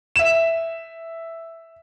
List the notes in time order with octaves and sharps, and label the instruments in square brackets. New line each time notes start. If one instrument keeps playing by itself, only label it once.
[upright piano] E5 E7